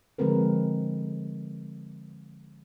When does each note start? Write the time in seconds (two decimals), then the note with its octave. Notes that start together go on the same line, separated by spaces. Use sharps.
0.18 D3 F3 G#3 C4 A#4 B4